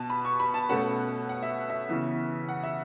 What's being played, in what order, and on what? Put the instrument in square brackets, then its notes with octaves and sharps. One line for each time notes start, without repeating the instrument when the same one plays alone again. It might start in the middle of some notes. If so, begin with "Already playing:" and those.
Already playing: [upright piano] B2 B3 A5
B5
C#6
B5
A5
B2 A3 C#4 F#5
F#5
E5
E5
C#3 E3 B3
F#5
E5